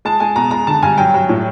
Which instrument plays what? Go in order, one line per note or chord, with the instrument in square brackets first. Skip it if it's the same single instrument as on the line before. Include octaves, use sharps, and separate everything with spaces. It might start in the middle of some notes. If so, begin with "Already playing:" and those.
[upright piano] G#3 A5
G#3 G#5
B2 A#5
G#3 A#5
D3 A5
G2 G#5
F#3 G5
F#3
A2